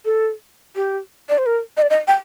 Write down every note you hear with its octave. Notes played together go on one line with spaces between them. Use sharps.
A4
G4
D5
C5
A#4
D#5
D5
D#5
G5